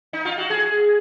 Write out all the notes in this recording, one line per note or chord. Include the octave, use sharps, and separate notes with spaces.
D#4
F4
F#4
G#4